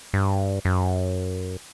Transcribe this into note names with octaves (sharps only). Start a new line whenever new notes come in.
G2
F#2